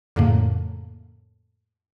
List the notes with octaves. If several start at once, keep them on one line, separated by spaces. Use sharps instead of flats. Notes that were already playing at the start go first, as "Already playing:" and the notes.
F2 A2 C#3 A3 A#3